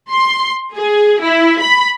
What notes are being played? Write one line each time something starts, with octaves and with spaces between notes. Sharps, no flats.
C6
G#4
E4
B5